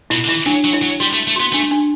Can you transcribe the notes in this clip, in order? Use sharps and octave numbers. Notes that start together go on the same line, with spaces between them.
B2 E4
D3
E3 E4
F#3 D4
F#3
E4
F#3
G3 F#4
A3
A3
B3 F#4
A3 D4
D4